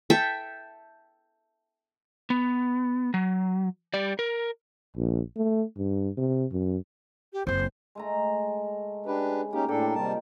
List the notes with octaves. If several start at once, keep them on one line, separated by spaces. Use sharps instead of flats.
A4 E5 G5
B3
F#3
G3 D5
A#4
A#1
A3
G2
C3
F#2
G4
F#1 C3 C5
G#3 A3 A#5
C#3 D4 G4 B4 B5
A#3 C#4 D#4 G4
A2 D4 G4 A4 A#4 D5
C3 D#3 F3 G3 A5